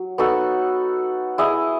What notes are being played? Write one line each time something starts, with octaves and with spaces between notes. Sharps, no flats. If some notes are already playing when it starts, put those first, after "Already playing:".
Already playing: F#3
B3 D#4 F#4 A4
E4 G#4 D#5